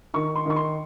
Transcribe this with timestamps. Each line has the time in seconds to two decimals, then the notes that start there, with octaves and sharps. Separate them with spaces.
0.14 D#3 C#6
0.36 C6
0.46 D#3 C#6
0.56 C6